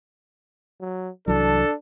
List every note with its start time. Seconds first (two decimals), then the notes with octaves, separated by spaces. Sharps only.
0.81 F#3
1.28 C2 E3 F#3 D4 A4